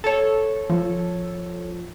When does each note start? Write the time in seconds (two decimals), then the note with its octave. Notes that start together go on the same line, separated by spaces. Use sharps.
0.04 A4 C#5
0.70 F3